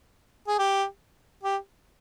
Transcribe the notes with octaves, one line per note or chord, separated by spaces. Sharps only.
G#4
G4
G4